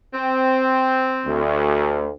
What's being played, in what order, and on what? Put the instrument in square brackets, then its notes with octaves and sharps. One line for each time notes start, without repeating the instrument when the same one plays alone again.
[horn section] C4
[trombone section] D2